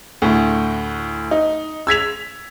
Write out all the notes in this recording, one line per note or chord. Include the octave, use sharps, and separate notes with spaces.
D2 A2
D#4
E6 G#6 B6 F7